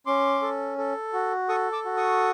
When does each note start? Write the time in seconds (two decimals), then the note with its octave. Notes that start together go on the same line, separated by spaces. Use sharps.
0.06 C#4 C6 D6
0.42 A4
0.78 A4
1.13 F#4
1.49 A4 C#6 D#6
1.73 D6 E6
1.85 F#4
1.97 C#6 D#6